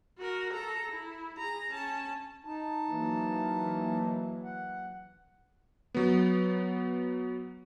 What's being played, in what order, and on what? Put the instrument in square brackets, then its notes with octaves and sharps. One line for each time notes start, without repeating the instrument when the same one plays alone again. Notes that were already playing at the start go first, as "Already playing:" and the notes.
[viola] F#4 A#4
A4 A#5
E4
G#4 A#5
C#4 A5
[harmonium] D#4 A5
[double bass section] E3 F#3 A#3
[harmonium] F#5
[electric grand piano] F#3 B3